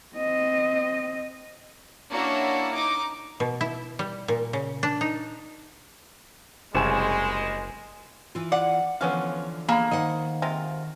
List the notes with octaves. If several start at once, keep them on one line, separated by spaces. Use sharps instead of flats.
C4 D#5
A#3 C#4 D4 E4 F#4
D#4 D6
B2
E4
G3
A#2
C#3
D4
D#4
F#1 C2 G#3 G#5 E7
E3 F4
D5 F#5
D3 E3 F3 B3 C#4 F5
A#3 G#4 B5
D#3 C5 D#5 F#5
C3 G#3 F4